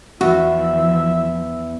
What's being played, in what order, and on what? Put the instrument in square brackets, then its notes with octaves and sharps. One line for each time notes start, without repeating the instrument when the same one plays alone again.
[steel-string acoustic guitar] E2 [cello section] E3 F3 [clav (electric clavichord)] F#4 [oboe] E5